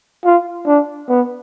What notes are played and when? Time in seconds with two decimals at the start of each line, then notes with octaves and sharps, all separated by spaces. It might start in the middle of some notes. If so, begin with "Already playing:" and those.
0.24 F4
0.67 D4
1.09 B3